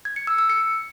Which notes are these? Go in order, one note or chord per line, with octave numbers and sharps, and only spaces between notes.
G#6
C#7
E6
E6
C#7